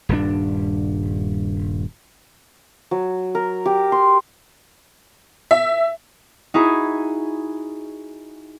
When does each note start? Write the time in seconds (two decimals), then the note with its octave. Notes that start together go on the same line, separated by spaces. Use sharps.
0.09 D#1 G2 D4
2.91 F#3
3.35 A#4
3.66 G4
3.92 C6
5.51 E5
6.54 D#4 E4 F#4 G#4